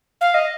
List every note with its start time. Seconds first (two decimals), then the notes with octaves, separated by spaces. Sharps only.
0.21 F5
0.34 D#5